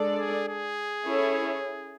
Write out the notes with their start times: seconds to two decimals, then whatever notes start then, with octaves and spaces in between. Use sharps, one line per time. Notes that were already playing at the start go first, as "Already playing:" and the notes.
Already playing: G#3 D4 A4 D5
0.20 G#4
0.49 G#4
1.07 C#4 E4 A4 C#5